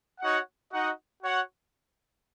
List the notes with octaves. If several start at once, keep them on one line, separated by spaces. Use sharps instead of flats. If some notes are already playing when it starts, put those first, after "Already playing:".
D#4 F#4 C#5 F#5
D#4 F#4 D#5 F#5
F#4 C#5 F#5